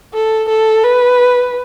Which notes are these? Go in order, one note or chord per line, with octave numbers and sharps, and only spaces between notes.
A4
A4
B4